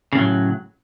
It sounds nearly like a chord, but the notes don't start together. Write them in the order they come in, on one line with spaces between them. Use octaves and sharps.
C#3 A2 F#3